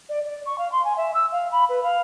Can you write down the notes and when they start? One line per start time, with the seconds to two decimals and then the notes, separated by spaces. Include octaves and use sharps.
0.09 D5
0.25 D5
0.46 C#6
0.58 F5
0.72 C6
0.84 G#5
0.97 E5
1.14 E6
1.32 F5
1.52 B5
1.69 B4
1.83 F5